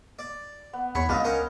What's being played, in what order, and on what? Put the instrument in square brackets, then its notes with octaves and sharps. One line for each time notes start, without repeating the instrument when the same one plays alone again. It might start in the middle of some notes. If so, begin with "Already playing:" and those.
[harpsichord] D5
[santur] B3
[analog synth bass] E2 [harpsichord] C#5 [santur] B5
[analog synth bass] C#2 [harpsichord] G#2 F4 [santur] D4 D#5
[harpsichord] C#4 A#4 C5